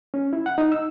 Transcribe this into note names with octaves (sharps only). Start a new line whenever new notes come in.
C#4
E4
F#5
D#4
E6